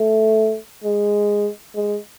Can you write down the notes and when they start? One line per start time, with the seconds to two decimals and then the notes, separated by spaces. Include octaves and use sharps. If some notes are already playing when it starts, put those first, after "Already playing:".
Already playing: A3
0.84 G#3
1.75 G#3